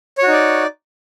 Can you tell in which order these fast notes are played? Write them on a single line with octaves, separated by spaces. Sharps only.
C#5 F#4 D#4 D5